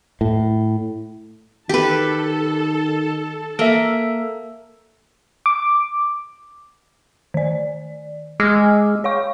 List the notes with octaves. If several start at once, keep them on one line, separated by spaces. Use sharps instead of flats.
A2
D#3 G4 A4 B4 A5
A#3 A4 E5
D6
D#3 D5
G#3 D6 E6 F6
C#5 F5 C#6